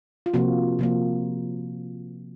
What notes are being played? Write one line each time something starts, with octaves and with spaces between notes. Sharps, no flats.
F4
C3 F3 A#3 F#4
C3 F3 A#3